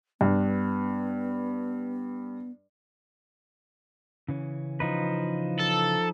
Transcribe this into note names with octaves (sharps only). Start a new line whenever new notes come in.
G2 B3
C#3 E3 C#4
F3 D#4 B4
A4